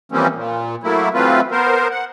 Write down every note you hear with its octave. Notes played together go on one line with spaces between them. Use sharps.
E3 F3 G3 A#3 C4 C#4
A#2
F#3 A3 A#3 E4
E3 F#3 A3 C4 F4 B4
B3 A#4 C5
F#5